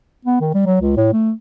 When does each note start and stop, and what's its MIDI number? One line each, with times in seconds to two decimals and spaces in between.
0.25 0.40 59
0.40 0.51 51
0.54 0.64 55
0.66 0.77 54
0.81 0.96 37
0.97 1.12 45
1.13 1.32 57